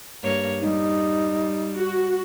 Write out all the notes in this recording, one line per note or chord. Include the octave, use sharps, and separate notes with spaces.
G2 A#3 C#5
G3 D#4
F#4